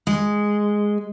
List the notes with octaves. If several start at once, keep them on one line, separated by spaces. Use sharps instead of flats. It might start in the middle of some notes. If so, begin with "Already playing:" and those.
G#3